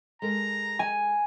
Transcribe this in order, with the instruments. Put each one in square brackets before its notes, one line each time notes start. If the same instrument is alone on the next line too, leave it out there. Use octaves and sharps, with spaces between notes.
[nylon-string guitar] G#3 A4 A#4 [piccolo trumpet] A#5
[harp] G#5